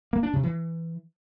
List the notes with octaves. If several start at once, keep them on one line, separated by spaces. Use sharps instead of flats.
A#3
D4
C3
E3